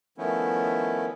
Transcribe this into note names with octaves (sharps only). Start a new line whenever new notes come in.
D#3 F3 A3 B3 C#4 E4